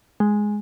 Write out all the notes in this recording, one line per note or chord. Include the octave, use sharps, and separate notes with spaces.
G#3